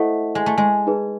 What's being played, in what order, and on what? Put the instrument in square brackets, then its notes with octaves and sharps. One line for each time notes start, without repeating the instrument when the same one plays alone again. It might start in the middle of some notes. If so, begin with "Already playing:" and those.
Already playing: [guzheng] A3 [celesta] E4 A4 C5 D#5 F#5
[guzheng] G#3
A3
G#3
[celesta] D#4 G#4 B4